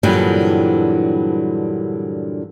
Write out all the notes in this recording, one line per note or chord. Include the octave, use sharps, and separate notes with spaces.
G2 A#2 D3 E3 F#3 G3